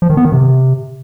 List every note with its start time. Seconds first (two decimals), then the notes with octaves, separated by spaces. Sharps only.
0.02 F3
0.10 D#3
0.17 B3
0.25 D#3
0.32 C3